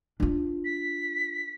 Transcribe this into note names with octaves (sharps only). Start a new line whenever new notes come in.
D4 F4
B6